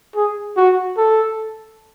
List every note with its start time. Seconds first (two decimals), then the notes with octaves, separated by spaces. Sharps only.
0.16 G#4
0.56 F#4
0.97 A4